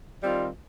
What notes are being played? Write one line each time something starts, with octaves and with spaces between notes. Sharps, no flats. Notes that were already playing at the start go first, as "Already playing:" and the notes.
D#3 G3 C4 F4